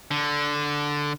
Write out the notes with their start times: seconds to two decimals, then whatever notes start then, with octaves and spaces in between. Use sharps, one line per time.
0.11 D3